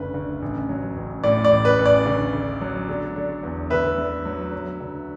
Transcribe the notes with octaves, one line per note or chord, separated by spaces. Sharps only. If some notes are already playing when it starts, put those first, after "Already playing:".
Already playing: F#1 D2 D3 B4
D2
A1
F#3
A1
A2 D5
D5
A1
B4
A1
D5
D2
D2
F#3
D3
D3
E2
D2 B4 E5
D3
F#3
F#3
D2